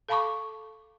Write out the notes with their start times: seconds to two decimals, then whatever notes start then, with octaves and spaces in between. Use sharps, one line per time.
0.09 A4 F5 A5 B5 C#6 D6